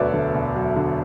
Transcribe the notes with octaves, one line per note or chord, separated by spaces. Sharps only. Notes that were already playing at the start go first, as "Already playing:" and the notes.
Already playing: E1 D2 F#3 B4 C#5 D5 E5
D3
E1
F#3
D3